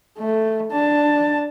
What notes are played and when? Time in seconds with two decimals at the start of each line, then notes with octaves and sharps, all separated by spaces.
0.18 A3
0.72 D4 A5